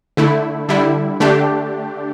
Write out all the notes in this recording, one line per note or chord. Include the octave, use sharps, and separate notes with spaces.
D3 A3 E4
D3 G3 E4
D3 A3 D4 G4